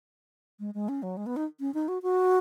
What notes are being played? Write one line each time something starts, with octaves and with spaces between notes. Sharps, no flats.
G#3
G#3
C#4
F#3
G#3
B3
D#4
C#4
D#4
F#4
F#4